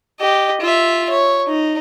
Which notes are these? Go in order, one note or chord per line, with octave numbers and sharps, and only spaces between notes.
G4 D#5
F4 E5
C#5
D#4